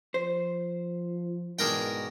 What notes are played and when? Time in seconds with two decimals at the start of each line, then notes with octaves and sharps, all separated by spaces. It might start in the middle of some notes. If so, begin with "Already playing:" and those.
0.14 F3 C5
1.59 G#2 B2 E3 D4 G#4 A#4 G5